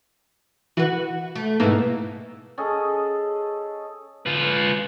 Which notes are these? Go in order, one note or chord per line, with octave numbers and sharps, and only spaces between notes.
E3 F#4 B4
A3
G#2 B2 E3 A3 A#3
C#4 G#4 A4 D#5
F4 B4